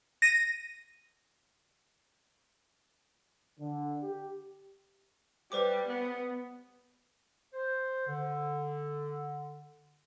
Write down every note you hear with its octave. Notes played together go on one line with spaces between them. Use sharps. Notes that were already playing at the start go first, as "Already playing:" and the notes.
A#6 D#7
D3
G4
G3 B4 C5 D6
B3
C5
D3